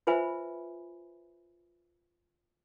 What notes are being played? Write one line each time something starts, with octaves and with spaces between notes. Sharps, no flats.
F4 B4 C5 E5 G#5 B5